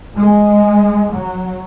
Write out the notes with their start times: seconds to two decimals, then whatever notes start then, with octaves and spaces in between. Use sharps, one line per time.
0.16 G#3
1.12 F#3